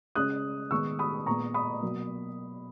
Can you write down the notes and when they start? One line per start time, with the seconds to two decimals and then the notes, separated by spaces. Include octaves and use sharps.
0.15 C#3 G#3 C#4 D#6 F#6
0.71 D#3 G#3 B3 C#6 E6
0.99 B5 D#6
1.26 A#2 G#3 B3 A#5 C#6
1.54 B5 D#6
1.82 B2 F#3 A#3